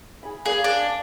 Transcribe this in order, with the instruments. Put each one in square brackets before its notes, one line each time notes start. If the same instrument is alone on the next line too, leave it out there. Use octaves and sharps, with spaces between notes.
[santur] G#4 B5
[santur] A#3 D5 F5 [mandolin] G#4
[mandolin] D4